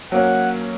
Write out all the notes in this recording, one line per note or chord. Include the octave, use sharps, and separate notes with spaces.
F#3 A#3 C#4 F#5